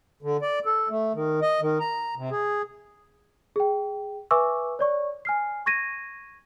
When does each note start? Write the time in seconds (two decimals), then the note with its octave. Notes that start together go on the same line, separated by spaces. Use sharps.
0.22 D3
0.42 D5
0.65 A4
0.89 A3
1.14 D#3
1.42 D#5
1.61 D#3
1.80 A#5
2.17 C3
2.31 G#4
3.56 G#4 G5
4.31 B4 E5 G#5 C#6 D6 E6
4.79 C#5 D5 C#6
5.25 G#5 F6 C7
5.66 C#6 G#6 A#6 D#7